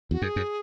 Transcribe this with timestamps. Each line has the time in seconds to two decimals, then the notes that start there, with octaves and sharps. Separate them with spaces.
0.11 E2 F#4
0.22 F#2 G#4
0.36 F#2